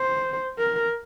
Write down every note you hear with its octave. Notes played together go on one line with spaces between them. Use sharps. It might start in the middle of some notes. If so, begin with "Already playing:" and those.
Already playing: C5
A#4